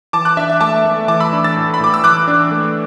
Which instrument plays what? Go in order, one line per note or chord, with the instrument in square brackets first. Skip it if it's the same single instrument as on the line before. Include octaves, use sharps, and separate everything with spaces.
[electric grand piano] E3 A5 D6
D6 F#6
D4 E5
E5
A3 A5 D6
A3
E3 A5 D6
B5 E6
D4
E6 A6
A2
B5
A2 D6
E6
E3 D6 F#6
D4
A3